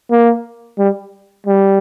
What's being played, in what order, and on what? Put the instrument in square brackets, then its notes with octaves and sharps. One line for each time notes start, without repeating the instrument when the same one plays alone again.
[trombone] A#3
G3
G3